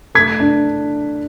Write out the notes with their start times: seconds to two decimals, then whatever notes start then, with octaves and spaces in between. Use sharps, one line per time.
0.15 A3 G#6 B6
0.40 D4